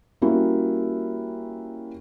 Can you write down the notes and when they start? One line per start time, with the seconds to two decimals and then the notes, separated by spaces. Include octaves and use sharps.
0.22 G3 A#3 C#4 E4 F#4